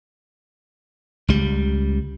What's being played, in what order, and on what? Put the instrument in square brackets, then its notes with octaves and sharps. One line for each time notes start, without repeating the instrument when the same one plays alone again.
[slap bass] C#2 G3